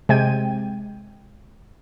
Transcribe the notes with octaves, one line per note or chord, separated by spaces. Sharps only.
C3 G#3 G5 G#6 D#7